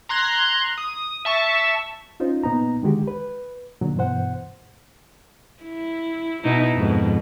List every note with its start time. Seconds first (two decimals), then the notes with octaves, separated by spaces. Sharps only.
0.09 A#5 C6 F#6 G#6
0.78 D#6
1.25 E5 A5 C#6
2.20 C#4 D#4 F4 C5
2.44 A#2 B3 D#4 A#5
2.82 D3 D#3 G#3 F#4 G4
3.08 B4
3.81 A#2 D3 F#3
3.96 G2 B2 E3 C5 F#5
5.63 E4
6.43 B2 D#4 E4
6.75 F2 G#2 B2